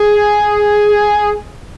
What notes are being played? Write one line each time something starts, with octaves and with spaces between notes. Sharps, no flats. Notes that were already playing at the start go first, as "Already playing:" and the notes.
Already playing: G#4